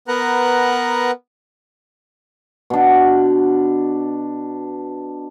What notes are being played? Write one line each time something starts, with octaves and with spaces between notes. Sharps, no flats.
B3 A#4 B4 F#5 A#5 F#6
B2 D4